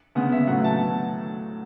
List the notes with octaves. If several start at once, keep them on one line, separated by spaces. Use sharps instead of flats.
C#3 G#3 B3 F#5
E5
A2 F#3 B3 F#5
A5